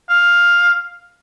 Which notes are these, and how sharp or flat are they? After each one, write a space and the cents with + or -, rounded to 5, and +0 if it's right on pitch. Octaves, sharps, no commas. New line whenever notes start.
F5 +10